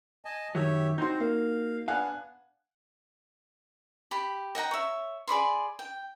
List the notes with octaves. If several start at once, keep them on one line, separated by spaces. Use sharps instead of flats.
D#5 G#5 A5
F#2 D#3 F#3 G4 C#5 E5
C4 D#4 F#4 C5 C6 G6
A#3 F5
B3 D4 F5 F#5 G#5 F#6
G4 B5
D#5 F#5 G5 A#5
C#5 E5
G#4 D5 B5 C6
G5